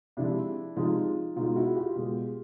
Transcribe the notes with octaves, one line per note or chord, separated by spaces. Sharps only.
C3 F3 G#3 D4 E4
C3 F3 G#3 D#4 F4
B2 G#3 D#4 F4
E4 F#4
F4 G4
B2 G#3